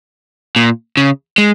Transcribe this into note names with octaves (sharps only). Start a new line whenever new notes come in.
A#2
C#3
G#3